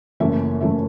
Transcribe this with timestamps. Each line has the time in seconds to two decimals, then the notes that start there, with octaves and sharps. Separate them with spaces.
0.20 F#1 F#2 E3 A3 C#4 E5
0.60 F#2 E3 A3 C#4 E5